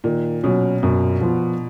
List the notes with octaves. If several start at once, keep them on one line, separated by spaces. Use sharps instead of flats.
A#2 D#3
B2 F#3 C#4
F#2 B2
F3 B3